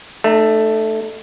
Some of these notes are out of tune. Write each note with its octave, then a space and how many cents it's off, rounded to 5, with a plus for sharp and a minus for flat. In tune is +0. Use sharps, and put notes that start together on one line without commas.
A3 +0 D#4 -40